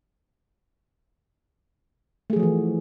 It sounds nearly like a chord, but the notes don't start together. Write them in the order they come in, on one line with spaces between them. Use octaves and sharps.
A3 G#4 F3 F#4 E3